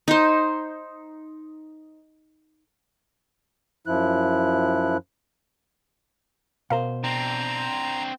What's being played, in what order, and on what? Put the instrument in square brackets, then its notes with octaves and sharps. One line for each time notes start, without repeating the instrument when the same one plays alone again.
[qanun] D#4 C5
[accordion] F#2 F3 E4 F#6
[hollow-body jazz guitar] B2 C5 [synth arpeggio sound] A#4 F5
[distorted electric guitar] C4 D4 [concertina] A#5